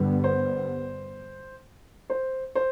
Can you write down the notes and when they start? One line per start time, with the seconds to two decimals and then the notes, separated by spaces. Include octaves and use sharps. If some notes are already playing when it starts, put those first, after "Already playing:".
Already playing: G2 D3 G3 B3
0.24 C5
2.10 C5
2.55 C5